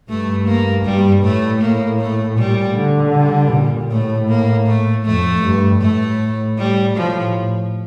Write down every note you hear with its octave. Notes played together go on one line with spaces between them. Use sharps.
G2 A3
A#3
G2 G3
A2 A3
A#3
A3
A#2 G3
D3
G3
A#2
A2 A3
A#3
A3
F2 A3
G2
A2 A3
G3
A2 F3